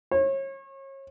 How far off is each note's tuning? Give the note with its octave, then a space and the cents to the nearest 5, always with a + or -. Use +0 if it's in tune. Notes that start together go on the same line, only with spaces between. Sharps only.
C#5 -35